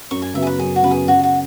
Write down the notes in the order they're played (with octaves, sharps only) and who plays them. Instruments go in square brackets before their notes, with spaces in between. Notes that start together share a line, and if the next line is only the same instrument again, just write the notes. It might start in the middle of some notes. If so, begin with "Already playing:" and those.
[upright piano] F#2 [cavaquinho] C#6
[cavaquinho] G#5
[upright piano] C#3 F#3 B3 [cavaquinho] E5
[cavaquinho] G#4
B4
[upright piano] F#2 [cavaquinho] G#4
[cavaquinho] F#4
[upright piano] C#3 F#3 B3 [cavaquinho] B4
[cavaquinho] G#4
[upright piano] C#3 [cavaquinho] F#4
[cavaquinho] F#4